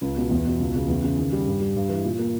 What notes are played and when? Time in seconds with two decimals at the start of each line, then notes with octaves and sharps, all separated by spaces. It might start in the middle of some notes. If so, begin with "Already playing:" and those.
0.01 C#2
0.17 B2
0.31 E2
0.45 B2
0.59 C#2
0.75 C#3
0.88 E2
1.04 C#3
1.18 D#3
1.32 G3
1.47 G2
1.60 G3
1.76 G2
1.89 E3
2.04 A#2
2.19 A#3